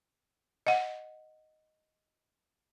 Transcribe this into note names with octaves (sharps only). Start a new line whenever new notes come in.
D#5 F#5